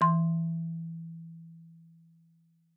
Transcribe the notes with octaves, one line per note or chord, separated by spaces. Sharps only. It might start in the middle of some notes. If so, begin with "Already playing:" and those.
E3 C6